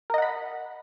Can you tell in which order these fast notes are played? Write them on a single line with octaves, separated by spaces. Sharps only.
A#4 D#5 F#5 B5